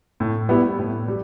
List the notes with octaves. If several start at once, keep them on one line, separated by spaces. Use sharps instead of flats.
A2
G3 B3 E4
A2
G3